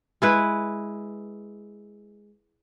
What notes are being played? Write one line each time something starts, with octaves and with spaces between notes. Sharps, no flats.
G#3 E4 B4